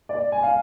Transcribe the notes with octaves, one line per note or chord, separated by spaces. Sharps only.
D5
G#5
F5